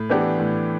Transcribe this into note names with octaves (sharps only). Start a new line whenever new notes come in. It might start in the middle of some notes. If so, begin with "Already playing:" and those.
Already playing: A2
E3 B3 D4 G4
A2